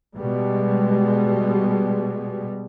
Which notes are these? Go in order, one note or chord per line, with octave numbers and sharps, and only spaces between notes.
B2 G3 G#3